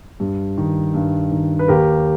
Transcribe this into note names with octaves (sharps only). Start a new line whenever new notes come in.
G2
D#3
G2
D#3
B4
D#2 G4 A#4